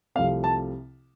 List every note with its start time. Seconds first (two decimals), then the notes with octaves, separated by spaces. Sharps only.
0.15 C2 C3 F3 A3 C4 F5
0.44 A5